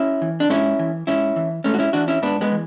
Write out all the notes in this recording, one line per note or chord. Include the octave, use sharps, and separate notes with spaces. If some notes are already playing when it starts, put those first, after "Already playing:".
Already playing: C#4 E4
E3
D4
G#2 C#4 E4
E3
G#2 C#4 E4
E3
G#2 A3 C#4
F#4
C#4 E4
E3 D4 F#4
C#4 E4
G#2 B3 D4
G#3 B3
E3